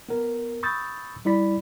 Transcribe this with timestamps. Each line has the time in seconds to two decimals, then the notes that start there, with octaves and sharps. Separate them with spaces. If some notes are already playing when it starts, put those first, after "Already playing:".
0.09 B3 A#4
0.63 B5 C#6 D#6 E6 G6 A6
1.25 G3 E4 D5 B5 B6